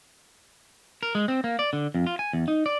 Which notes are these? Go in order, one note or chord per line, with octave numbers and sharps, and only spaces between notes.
A#4
G#3
C4
A#3
D5
D3
F2
F4
G#5
E2
D#4
D5